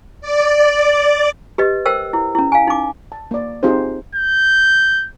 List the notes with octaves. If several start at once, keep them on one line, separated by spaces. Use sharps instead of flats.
D5
G4 B4 D#5
A#4 C5 G5 E6
E4
C#4 E4
F5 G#5
D#4 D6
A5
A#3 D5
C4 D#4 F4 G4 G#4 C5
G6